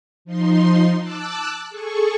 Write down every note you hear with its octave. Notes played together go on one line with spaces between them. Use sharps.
F3 D#4 C6
A5 D6 E6 F#6
G#4 A4 C#6